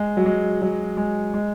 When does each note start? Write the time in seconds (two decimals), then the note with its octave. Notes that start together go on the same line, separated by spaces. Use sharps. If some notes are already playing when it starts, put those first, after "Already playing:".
Already playing: G#3
0.17 F#3
0.26 G#3
0.62 F#3
0.97 G#3
1.34 G#3